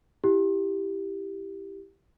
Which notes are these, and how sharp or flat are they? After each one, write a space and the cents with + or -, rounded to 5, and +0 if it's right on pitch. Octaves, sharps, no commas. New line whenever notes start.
E4 +0 G4 +0